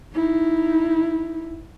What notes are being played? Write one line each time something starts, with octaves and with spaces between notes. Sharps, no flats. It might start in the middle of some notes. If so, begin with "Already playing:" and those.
D#4 E4